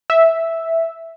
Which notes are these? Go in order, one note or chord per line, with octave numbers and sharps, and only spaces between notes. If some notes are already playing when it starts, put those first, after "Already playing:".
E5